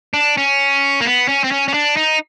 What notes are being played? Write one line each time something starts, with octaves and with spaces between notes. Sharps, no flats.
D4
C#4
A#3
B3
C#4
C4
C#4
C#4
D4
D#4